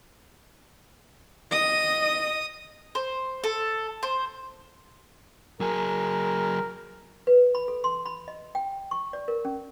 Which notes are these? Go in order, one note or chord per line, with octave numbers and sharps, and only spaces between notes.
D#5 D#6
C5
A4
C5
F#3 G#4 A#4
B4
B5
A4
C6
B5
D#5
G5
C#6
D5
A#4
C#4